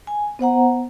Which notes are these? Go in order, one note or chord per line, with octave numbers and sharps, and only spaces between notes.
G#5
B3 C5 F#5 A#5